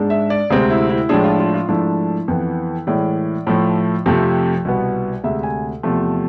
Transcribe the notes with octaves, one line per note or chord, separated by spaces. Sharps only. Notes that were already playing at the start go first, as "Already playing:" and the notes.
Already playing: G#2 G#3 D4
E5
D5
D2 C3 G#3 C4 G#4
E4
E4
A2 F3 G#3 D4 G#4
F4
F4
F4
G#2 F3 A3 D4 E4
F2 E3 B3
A2 E3 G#3 D5
A2 F3 A3
F2 C3 F3 A3
C2 B2 B3
D2 C3 G#3 E5
G#5
E2 C3 F3 A3